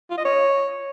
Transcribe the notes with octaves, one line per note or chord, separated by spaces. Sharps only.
F4
D#5
C#5